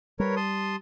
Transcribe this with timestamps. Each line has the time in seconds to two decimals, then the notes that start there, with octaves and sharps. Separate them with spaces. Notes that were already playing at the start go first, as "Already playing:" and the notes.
0.20 G3 A#4 B4 C#5
0.36 A5 C6 D#6